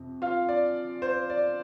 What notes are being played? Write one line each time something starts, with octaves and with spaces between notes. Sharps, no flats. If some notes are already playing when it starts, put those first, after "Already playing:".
Already playing: F2 C3
F4 F5
D5
C5
D5